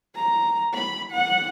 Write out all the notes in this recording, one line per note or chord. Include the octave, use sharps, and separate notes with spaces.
A#5
B5
F#5